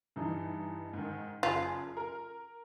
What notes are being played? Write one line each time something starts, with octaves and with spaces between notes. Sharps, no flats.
G2 E3 D#4
G#2 D#3
F#1 F4 G#4
A#4